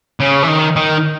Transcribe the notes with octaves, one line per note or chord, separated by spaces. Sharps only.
C#3
E3
D#3
D#3